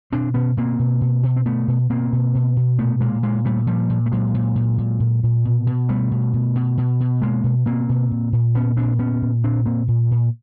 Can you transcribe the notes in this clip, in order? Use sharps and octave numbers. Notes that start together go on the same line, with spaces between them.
B2 C4 D4
B2 B3 C#4
B2 A#3 C4
B2
B2
B2
C4
B2 A3 B3
B2
B2 A#3 C4
B2
B2
B2
A#2 A3 B3
A#2 G#3 A#3
A#2 G#3 A#3
A#2 G3 A3
A#2 F3 G3
A#2
A3
A#2 F#3 G#3
A#2
A#2
A#2
A#2
A#2
B2
B2
B2 G3 A3
B2
B2
B2
B2
B2
B2 G#3 A#3
B2
B2 A#3 C4
B2
A#2
A#2
A#2 B3 C#4
A#2 C4 D4
A#2 B3 C#4
A#2
A#2 C4 D4
A#2 A#3 C4
A#2
A#2